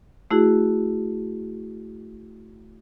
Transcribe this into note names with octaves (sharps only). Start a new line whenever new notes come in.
A3 E4 F#4 G#4